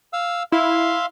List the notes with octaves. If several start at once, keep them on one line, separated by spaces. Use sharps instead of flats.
F5 E6
E4 E5 F5 C6